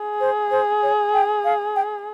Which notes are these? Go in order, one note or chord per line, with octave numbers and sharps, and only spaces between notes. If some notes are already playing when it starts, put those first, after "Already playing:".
Already playing: G#4
C5
C5
C#5
G5
F5
G5